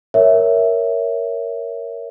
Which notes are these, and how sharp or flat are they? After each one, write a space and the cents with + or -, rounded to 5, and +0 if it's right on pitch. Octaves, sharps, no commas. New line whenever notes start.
A#4 +0 C#5 +0 E5 +0